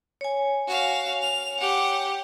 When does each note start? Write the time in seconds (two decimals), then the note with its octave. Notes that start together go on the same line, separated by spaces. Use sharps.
0.21 C#5 G#5
0.67 F#4 F5
1.22 F7
1.60 G4 F#5